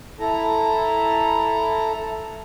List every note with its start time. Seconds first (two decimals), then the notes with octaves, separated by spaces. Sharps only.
0.19 E4 A4 A#5